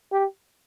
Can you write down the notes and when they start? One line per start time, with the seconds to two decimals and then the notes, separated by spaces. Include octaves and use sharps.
0.12 G4